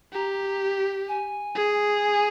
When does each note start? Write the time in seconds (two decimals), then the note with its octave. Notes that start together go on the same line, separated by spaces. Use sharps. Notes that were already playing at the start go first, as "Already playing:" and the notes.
0.13 G4 A#5
1.08 G#5
1.55 G#4
2.02 G#5